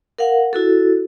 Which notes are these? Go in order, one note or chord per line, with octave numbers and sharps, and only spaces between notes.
A#4 F5 F#5
E4 F#4 A4